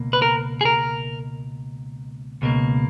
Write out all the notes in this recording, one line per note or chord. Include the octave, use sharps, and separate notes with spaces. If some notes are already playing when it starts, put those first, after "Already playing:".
Already playing: C#2 B2 A#3
B4
A#4
G#4
A#4
C#2 B2 A#3